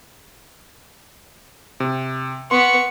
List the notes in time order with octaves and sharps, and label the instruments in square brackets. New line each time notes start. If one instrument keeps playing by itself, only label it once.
[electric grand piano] C3
[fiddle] B3 [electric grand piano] C6 [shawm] C#6